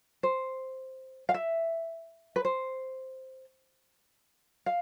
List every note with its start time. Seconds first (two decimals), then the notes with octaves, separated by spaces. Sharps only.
0.23 C5
1.29 F5
1.34 E5
2.36 B4
2.45 C5
4.66 F5